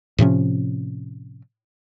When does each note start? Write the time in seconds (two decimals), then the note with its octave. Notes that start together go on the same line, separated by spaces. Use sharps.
0.18 A2 C3 F3 C#4